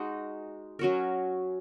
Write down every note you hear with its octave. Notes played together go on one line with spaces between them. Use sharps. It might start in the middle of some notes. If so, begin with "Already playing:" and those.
Already playing: G#3 D#4 F#4
F#3 C#4 F#4 A#4